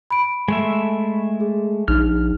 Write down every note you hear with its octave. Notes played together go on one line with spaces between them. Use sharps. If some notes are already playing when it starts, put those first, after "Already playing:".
B5 D7
G#3 A3 E5
G#4
A#1 D#4 F6